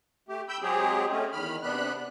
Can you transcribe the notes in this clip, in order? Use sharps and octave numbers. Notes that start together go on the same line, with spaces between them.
A3 G4
G5 B5 E6 G6
F#3 G#3 C4 G4 G#4
A3 C4 C#4
E2 D#3 B5 F6
C3 B3 D4 B5 F#6